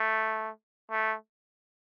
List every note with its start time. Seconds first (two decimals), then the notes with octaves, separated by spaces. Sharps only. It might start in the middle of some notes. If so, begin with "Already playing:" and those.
Already playing: A3
0.91 A3